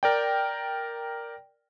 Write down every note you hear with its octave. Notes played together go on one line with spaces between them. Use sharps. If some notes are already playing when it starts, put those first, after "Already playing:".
A#4 D5 G5